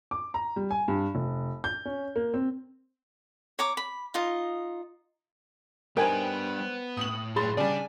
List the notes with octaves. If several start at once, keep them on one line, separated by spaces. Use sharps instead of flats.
D6
A#5
G3
G#5
G2
F1
G6
C#4
A#3
C4
C#5 A#5 D6
B5
D#4 F4 D#5
G3 B3 D4 A#4 C5 D#5 G5 G#5
A2 D#6 F#7
G2 F#3 G#4 B5 C6 A6
C#3 G3 D4 D5 G#5